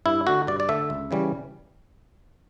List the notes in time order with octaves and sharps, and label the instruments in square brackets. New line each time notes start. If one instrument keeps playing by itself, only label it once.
[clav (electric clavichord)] G2 E4
D3 A3 F#4
G2 D5
D5
D3 A3 E5
C#2
C#3 E3 G3 C#4